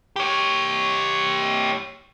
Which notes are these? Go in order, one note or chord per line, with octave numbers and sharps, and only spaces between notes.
G4 C#5